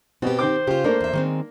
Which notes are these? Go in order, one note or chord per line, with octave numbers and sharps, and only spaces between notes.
B2 B3 C4 G4
D#3 C5 D6
C#3 F4 G4
A3 A#3 D4 A#4
E2 E5
D#3 G#3 C4